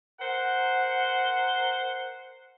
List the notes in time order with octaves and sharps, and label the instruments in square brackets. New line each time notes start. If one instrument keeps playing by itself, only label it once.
[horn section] A#4 C5 F#5